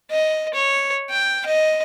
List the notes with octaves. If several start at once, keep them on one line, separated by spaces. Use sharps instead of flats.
D#5
C#5
G5
D#5